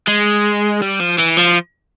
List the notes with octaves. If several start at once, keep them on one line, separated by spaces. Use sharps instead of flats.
G#3
G3
F3
E3
F3